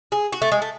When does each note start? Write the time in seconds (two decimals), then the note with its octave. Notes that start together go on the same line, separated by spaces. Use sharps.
0.12 G#4
0.33 F#4
0.42 A3
0.52 G#3
0.62 A3